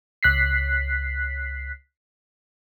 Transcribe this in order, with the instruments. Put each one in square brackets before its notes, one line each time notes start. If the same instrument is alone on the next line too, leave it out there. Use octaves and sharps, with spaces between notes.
[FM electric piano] C#2 F#6 B6 C7